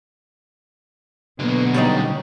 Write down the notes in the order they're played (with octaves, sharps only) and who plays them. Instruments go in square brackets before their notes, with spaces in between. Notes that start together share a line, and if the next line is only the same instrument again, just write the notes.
[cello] B2 A#3 [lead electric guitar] D3 F#3 [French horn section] B3
[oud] G3 C#4 D#4